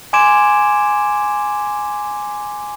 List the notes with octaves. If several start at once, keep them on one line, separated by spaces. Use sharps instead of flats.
G#5 C6 D6 G#6 D7 E7